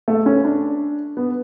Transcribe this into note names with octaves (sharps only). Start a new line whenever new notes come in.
A3
C#4
D4
B3